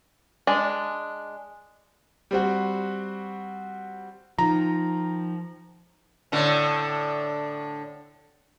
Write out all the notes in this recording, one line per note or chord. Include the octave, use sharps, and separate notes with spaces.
G#3 D4
G3 C4 F#4
D#3 F3 A#5
A2 D3 A4